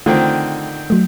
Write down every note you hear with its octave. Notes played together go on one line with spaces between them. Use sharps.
D3 D#3 A3 C4 F4
F#3 A3